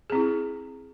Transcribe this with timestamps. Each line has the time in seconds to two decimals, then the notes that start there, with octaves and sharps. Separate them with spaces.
0.10 G#4
0.12 C4
0.15 E4